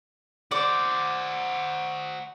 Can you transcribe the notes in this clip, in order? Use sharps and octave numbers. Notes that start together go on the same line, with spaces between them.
F#4 C5 D5